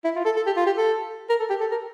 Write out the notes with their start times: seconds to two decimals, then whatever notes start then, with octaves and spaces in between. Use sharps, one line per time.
0.05 E4
0.16 F4
0.25 A4
0.36 A4
0.46 G4
0.57 F4
0.67 G4
0.77 A4
1.29 A#4
1.40 A4
1.50 G4
1.61 A4
1.71 A#4